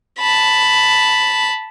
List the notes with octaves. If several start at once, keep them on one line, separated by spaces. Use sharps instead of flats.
A5 B5